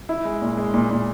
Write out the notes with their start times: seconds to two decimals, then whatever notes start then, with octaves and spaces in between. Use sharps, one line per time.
0.09 E4
0.25 G#3
0.42 A#2
0.57 G#3
0.74 A#2
0.90 A#2